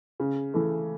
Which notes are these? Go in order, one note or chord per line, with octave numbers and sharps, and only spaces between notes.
C#3
E3 A3